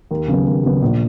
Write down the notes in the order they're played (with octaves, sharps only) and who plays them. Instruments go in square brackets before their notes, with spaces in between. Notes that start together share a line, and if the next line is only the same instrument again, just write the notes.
[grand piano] D#2
C#3 F#3 B3
D#2
C#3 F#3 B3
A#1